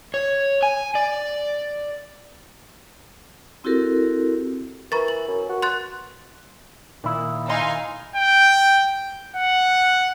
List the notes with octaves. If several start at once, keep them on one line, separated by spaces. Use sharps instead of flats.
C#5
G#5
D5
C4 E4 F#4 G4 A4 A#4
E3 A#4 B4 A#5 C#6 A6
F#7
F#2
F#4
C6 F#6 A6
A#2 D#3 E4
D#4 F5 G#5 C6 E6
G5
F#5